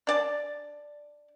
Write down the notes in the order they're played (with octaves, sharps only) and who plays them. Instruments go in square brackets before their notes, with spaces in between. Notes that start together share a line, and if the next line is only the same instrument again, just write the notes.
[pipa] D4 D5 A5